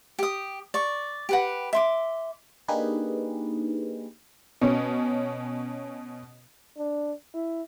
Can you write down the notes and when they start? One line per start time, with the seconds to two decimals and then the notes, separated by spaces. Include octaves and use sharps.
0.19 G4 D#6
0.74 D5 C#6
1.29 G4 B4 F#5
1.73 E5 C6 D6
2.68 A#3 D4 D#4 G4 G#4 B4
4.61 B2 C#4
6.78 D4
7.34 E4